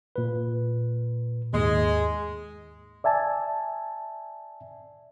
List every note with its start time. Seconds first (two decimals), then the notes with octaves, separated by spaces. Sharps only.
0.16 A#2 B4
1.53 D#2 G#2 G#3
3.04 D5 E5 G#5 A5